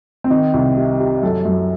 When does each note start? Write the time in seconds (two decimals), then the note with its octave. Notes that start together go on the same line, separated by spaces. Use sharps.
0.24 C4
0.30 D#3 D#4
0.54 C2
0.77 C3
1.00 G3
1.22 F#2 A4
1.45 F#2